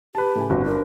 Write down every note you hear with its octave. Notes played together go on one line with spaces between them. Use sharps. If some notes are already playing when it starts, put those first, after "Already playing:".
G4 B4 A5
A2 C#3 G#5
G1 C4 F#4
D4 A#4